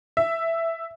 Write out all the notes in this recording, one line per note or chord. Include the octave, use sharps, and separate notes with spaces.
E5